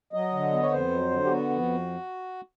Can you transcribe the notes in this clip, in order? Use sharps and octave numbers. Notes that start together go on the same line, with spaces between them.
F#3 D#5
D3
B3
C#5
F2 C5
F#3
D3
G4
B3 F#4
F2